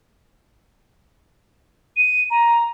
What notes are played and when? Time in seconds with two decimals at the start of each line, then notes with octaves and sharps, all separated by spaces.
1.96 D#7
2.30 A#5